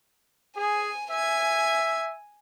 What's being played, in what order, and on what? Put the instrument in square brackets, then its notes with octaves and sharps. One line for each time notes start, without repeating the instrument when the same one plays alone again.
[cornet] G#4 [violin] G#5
[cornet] E5 [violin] G#5 G#6